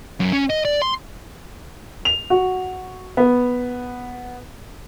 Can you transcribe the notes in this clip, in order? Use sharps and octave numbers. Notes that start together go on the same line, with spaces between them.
F#2
C#4
D#5
D5
C6
F7
F#4
B3